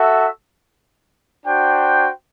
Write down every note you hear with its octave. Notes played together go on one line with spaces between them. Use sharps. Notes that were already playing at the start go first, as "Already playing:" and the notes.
Already playing: F#4 A4 E5
D4 F#4 C5 G5